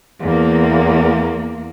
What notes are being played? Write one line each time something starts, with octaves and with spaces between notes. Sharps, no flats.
E2 A#3